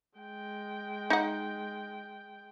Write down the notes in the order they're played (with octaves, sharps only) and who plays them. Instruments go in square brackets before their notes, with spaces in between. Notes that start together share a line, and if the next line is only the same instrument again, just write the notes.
[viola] G#3 G5
[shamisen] D#4 F#5